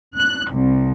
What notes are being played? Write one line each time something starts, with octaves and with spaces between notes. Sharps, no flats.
F#6
C2